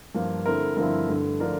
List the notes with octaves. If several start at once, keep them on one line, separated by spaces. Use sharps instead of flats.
G2 F3 A#3
D3 A3 C4 E4 A#4
G2 D3 F3 C4 E4 A#4
G2 D3 A3
D3 F3 A3 D4 A#4